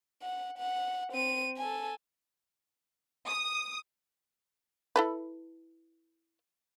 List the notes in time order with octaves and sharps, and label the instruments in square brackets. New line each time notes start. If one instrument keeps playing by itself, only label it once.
[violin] F#5
F#5
C4 D#7
A4 G#5
[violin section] D#6
[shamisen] E4 A4 B4